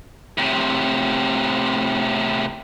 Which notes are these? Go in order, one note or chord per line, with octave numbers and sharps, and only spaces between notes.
A2 C3